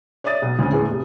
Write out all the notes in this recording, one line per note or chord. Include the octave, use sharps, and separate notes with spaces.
C#5 D5 E5 D#6 A6
B1
D2 C4 C#4
E2 A2 G#3
F1